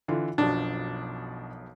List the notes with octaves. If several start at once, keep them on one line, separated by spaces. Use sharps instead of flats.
D3 E3 F4
B1 F#2 B2 F3 D4